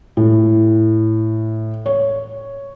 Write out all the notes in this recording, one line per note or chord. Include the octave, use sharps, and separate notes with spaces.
A2
C#5